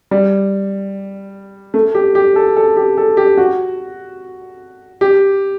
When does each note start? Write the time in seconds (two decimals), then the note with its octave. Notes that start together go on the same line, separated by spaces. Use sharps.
0.11 G3
1.74 A3
1.95 G4
2.15 G4
2.36 A4
2.56 A4
2.77 G4
2.97 A4
3.17 G4
3.37 F#4
5.01 G4